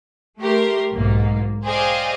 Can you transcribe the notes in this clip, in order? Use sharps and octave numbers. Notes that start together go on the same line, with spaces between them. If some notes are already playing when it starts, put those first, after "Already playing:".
A3 G4 A#4 C6
B1 G#2 A#3
G#4 C5 D5 D#5 F5 G5